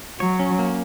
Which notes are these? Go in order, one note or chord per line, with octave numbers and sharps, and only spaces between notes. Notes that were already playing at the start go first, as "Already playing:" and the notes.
F#3 C#5
C#4
A#3